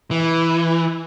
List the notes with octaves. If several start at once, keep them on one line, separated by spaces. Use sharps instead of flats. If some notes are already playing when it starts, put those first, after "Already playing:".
E3